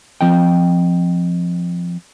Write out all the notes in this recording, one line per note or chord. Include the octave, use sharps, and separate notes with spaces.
F3 C4 D#5 G5